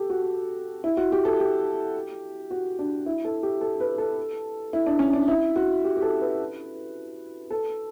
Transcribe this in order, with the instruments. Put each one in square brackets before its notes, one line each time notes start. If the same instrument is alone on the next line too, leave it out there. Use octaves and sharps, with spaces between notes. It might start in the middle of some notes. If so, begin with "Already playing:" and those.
Already playing: [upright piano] G4 A4
F#4
E4
F#4
G4
A4
G4
F#4
D4
E4
A4
G4
A4
B4
A4
E4
D4
C#4
D4
E4
F#4
G4
G4
A4
B4
A4